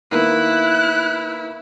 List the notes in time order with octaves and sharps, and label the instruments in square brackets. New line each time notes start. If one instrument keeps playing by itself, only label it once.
[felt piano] D#3 A#3 B3 [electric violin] E4 [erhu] F#6